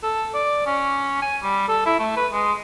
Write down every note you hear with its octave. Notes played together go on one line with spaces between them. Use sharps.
A4
D5
C#4
G#5
G3
A4
E4
A3
B4
G#3